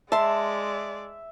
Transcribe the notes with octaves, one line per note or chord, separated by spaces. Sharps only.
G#3 D5 E5 A5 C6